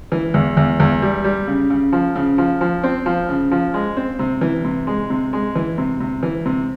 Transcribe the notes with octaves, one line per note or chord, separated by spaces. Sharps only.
E3
E2
E2
E2
G3
G3
C#3
C#3
F3
C#3
F3
F3
C4
F3
C#3
F3
G#3
C4
C3
E3
C3
G#3
C3
G#3
E3
C3
C3
E3
C3